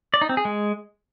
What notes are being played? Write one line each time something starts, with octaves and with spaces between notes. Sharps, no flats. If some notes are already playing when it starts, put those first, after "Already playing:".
D5
D#4
C4
G#4
G#3